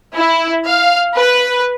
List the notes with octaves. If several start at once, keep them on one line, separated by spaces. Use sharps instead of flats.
E4
F5
B4